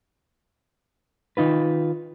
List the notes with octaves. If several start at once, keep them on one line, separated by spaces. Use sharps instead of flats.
D#3 D#4 F4 B4